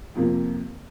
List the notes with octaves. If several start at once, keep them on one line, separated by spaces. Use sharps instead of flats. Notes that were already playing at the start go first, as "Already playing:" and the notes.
F2 C3 F3 A#3